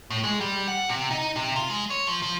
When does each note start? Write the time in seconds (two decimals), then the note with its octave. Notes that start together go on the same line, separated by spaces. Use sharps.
0.10 A2
0.24 G#3
0.41 G3
0.68 F#5
0.89 C3
1.11 D#4
1.36 C3
1.56 F4
1.70 G#3
1.90 C#5
2.07 F3
2.22 F3